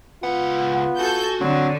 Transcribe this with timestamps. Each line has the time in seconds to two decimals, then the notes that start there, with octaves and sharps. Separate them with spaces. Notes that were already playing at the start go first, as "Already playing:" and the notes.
0.23 C#2 B3 F4 F#5
0.99 F#4 A4 G#5 G6
1.41 D3 F#3 C4